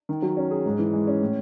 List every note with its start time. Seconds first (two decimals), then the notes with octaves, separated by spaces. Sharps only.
0.09 D#3
0.22 F#3
0.37 C#4
0.51 G#4
0.65 G#2
0.79 E3
0.93 G#3
1.07 C#4
1.21 A2